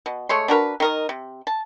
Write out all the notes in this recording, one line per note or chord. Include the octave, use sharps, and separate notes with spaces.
B2
G#3 A3 C#5 C6
D4 F#4 A#4 B4
D#3 A#4 D#5
C3
A5